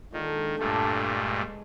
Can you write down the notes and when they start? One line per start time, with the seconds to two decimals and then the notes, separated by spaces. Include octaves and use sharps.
0.13 A#2 D3 D#3 G#3
0.59 G2 A#2 A3 D4 G4 A4
0.99 G#3 B4 C#5